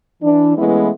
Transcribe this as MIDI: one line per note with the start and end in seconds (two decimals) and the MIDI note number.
0.22 0.55 52
0.22 0.55 62
0.57 0.89 52
0.57 0.89 56
0.57 0.89 57
0.57 0.89 59
0.57 0.89 61
0.57 0.89 64